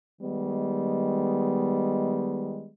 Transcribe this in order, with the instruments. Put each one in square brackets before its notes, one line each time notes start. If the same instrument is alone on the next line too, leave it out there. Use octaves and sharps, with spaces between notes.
[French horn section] D#3 G3 G#3 B3